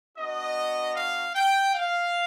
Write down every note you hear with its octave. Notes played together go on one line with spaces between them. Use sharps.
B3 D4 F#4 D#5
F5
G5
F5